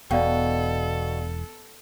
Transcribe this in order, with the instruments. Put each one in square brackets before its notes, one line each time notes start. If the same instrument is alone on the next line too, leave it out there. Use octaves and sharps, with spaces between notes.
[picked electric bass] E1 [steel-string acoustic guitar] B2 [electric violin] A4 [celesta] D5 F5 G5